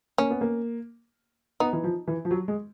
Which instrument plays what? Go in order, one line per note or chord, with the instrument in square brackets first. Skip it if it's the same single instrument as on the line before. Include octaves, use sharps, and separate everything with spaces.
[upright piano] A#3 [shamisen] C#4
[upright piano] B3
A#3
[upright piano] B3 [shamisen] D#4
[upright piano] E3
F3
E3
F3
F#3
G#3